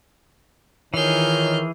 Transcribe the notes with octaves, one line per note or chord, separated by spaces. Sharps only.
D#3 E3 D#4 F4 G#4 C#5 F6 G6